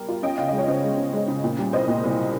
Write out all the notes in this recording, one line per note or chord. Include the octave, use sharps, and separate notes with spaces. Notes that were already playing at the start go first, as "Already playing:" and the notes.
Already playing: G3 A#4
F4
C#4 D#5 G5
C#3 F5
G#3 D#5
C#5
C#3 C5 D#5
G#3
C#3
G#3
C#3
A#2
G3
C2 C5 D#5
A#2
C2